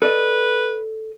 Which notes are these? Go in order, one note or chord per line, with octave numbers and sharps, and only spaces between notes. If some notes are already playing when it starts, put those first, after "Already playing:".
A4 B4 D5 D#5